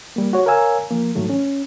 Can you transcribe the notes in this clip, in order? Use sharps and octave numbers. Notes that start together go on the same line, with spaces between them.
G3 A#3
F#4 C#5
A#4 C#5 F5 G#5 E6
F3 A#3
G#2 D#3 F#3 A3
C#4